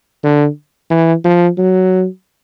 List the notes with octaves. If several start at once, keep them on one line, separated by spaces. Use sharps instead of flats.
D3
E3
F3
F#3